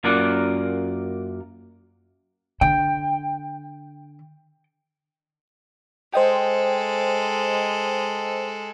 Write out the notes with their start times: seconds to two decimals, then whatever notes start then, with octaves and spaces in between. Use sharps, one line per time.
0.04 F#2 A#3 F4 A#4 D5 F#5
2.61 D3 G5
6.14 G#3 A4 C5 D#5 G5